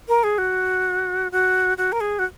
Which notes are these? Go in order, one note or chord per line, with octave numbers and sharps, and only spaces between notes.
A#4
G#4
F#4
F#4
F#4
A#4
G#4
F#4